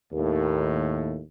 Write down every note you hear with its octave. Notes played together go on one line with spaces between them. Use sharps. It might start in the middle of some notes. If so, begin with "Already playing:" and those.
D#2 A2